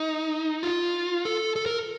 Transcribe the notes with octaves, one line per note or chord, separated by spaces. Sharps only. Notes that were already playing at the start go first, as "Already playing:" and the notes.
Already playing: D#4
F4
A4
A4
A#4